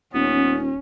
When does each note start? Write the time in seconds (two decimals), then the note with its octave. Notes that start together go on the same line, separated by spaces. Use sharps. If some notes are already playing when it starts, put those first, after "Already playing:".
0.14 D#1 B3 C#4